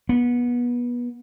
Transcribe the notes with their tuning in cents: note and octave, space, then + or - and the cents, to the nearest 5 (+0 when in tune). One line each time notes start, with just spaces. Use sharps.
B3 -25